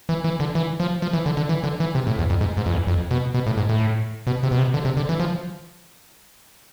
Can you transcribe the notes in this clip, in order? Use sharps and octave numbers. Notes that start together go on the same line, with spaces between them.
E3
E3
D3
E3
F3
F3
E3
D3
D3
E3
D3
E3
C3
A2
E2
F2
G#2
G#2
F2
E2
F2
B2
B2
A2
G#2
A2
B2
C3
B2
C3
D3
C3
D3
E3
F3